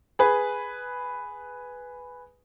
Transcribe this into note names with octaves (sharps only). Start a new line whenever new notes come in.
G#4 B4